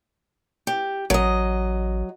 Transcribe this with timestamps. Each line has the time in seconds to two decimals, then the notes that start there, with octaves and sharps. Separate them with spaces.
0.67 G4
1.10 A1 F#3 D#5